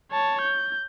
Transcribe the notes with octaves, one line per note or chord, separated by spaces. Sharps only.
C#5 A5
G6